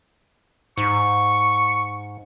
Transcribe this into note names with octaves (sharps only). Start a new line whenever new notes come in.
G#2 C#6